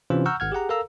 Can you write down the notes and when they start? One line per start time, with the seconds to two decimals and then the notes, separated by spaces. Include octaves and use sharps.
0.10 C3 E3 C#4 D4 F4 C5
0.26 F#5 A#5 C#6 E6 F6 G6
0.40 G#1 F#5 F6 G#6
0.52 G4 G#4 F#5 A#5
0.69 A4 A#4 F5 A#5 E6